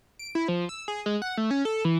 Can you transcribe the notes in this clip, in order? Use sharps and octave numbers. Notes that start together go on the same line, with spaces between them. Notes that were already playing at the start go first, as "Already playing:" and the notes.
D7
E4
F3
E6
G#4
G#3
F#5
A3
C#4
A4
E3